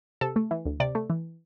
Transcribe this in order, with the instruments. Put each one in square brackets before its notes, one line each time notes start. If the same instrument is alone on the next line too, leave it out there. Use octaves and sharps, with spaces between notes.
[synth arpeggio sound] C3 A4
A3
E3
D2
C3 D5
A3
E3